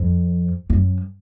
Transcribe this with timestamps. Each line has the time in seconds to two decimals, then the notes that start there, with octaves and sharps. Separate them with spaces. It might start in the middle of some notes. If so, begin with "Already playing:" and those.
Already playing: F2
0.70 F#2